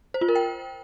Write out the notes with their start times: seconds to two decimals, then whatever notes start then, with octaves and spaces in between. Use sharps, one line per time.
0.14 C5
0.21 F4
0.28 A#4
0.35 G5